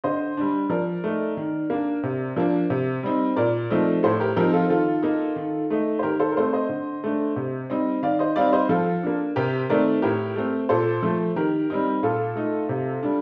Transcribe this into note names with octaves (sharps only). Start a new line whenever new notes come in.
D3 C5 D#5
G3 D4
F3 A#4 D5
A3 D#4
D#3
A#3 D4
C3
F3 A#3 D4
C3
G3 C4 D#4
A#2 A#4 D5
F3 A3 C4 D#4
A2 A4 C5
G4 A#4
F3 C4 D#4 G4 A#4
F4 A4
D#3 F4 A4
A#3 D#4
D#3
A3 D#4
C5
D#3 G4 A#4
A4 C5
A#4
A3 C4 A4 C5
C5 D#5
D3
A3 D4
C3
G3 C4 D#4
D#3 D5 F5
C5 D#5
G3 C4 D#4 D5 F5
C5 D#5
F3 F4 A4
A#3 D4
C3 G4 A#4
D#3 A3 C4 A#4 D5
A2 G4 A#4
A3 C4
A#2 A4 C5
F3 A3
D#3 G4 A#4
G3 C4 D#4
A#2 F4 A4
A3 D#4
C3
G3 D4